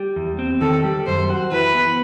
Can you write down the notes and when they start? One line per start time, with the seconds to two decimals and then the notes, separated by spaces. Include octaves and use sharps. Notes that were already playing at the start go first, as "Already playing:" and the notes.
Already playing: G3
0.16 E2
0.39 C4
0.61 D#3 A4
0.84 G3
1.06 F#2 C5
1.30 F#4
1.51 E3 B4
1.74 B3